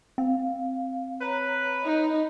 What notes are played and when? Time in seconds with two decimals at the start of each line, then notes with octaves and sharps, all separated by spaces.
0.18 C4 F5
1.21 B4 C#5 A#5
1.83 D#4 D#5